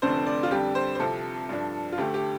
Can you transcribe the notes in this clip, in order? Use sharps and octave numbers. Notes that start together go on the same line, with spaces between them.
F1 F2 D3 A3 D4 C5
D5
F4
F2 D3 G3 D4 G4
C5
C5
C2 C3 F3 A4
G2 F3 D4
F4
D2 D3 A3 G4
G4